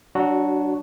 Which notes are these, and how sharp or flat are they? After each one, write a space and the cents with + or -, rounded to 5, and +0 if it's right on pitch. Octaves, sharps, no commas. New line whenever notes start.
F#3 +25 D4 +0 F#4 +0